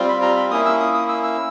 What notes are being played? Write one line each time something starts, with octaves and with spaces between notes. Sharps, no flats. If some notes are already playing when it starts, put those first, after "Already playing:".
Already playing: G3 C4 F4
B5
A#5
B5
A#3 C#4 E4 D#6
E6
D#6
D#6
E6
E6